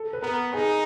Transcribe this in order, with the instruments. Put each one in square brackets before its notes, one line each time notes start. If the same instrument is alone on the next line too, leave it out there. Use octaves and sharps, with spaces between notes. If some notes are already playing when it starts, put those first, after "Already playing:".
Already playing: [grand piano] A4
B4
[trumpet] B3 [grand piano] A#4
[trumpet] D#4 [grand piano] G#4